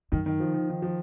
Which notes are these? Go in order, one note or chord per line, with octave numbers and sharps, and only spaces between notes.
F#2 D#3
D#3
F3
D#3
D#3
F3